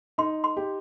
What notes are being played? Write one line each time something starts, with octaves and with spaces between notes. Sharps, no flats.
D#4 C6
C6
G4